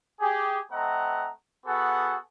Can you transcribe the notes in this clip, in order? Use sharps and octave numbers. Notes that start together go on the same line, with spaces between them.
G4 G#4
A3 C4 D#5 F#5 A#5
B3 F#4 G#4 A4 F#5